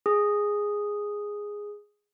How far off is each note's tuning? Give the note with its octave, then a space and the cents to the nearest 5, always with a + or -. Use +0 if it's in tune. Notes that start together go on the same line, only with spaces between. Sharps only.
G#4 -5